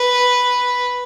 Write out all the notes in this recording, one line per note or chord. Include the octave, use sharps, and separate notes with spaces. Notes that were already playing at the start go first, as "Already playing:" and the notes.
Already playing: B4